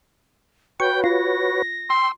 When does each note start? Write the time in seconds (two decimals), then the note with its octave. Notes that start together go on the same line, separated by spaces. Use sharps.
0.80 F#4 B4 C#5 G5 C#6
1.04 F4 A#6
1.90 G5 C6 E6